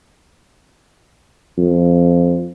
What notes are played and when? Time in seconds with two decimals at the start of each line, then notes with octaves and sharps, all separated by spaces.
1.58 F2